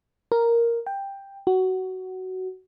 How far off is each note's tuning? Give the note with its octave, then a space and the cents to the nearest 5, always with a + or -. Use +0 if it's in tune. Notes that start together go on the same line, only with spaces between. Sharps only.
A#4 +0
G5 +10
F#4 +15